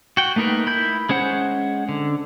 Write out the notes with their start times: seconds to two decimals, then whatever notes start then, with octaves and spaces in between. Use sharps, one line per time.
0.17 F#4 G5
0.36 A3 A#3 D#4 A#4 B4
0.66 E4 B5 G6
1.09 G#3 C#4 C5 F#5
1.89 D3